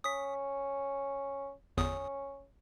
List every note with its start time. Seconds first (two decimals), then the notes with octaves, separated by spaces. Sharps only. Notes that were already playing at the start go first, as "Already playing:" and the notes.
0.04 C#4 D#6 B6
1.78 G1 E2 C#4 D#6